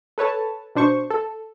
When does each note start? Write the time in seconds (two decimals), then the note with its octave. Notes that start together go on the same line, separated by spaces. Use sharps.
0.18 A4 B4 C#5 A5
0.75 B2 D4 C5 C#6
1.10 A4